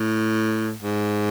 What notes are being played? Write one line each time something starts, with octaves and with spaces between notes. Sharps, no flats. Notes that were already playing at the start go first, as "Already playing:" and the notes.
Already playing: A2
G#2